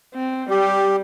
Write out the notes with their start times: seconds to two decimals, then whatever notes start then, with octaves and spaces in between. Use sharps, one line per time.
0.14 C4
0.50 G3 G4